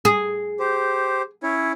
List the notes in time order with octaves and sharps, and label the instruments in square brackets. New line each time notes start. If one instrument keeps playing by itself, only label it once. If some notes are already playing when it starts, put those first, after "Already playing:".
[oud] G#4
[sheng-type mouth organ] G4 C5
C#4 E4 C#5